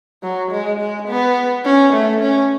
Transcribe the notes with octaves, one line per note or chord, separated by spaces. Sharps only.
F#3
G#3
G#3
B3
C#4
A3
C#4